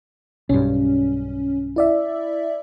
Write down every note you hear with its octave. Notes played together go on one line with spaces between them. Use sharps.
B1 G2 C#4
E4 D5 E5